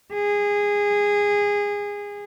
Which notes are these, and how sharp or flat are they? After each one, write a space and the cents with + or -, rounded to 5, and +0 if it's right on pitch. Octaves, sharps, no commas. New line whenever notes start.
G#4 -20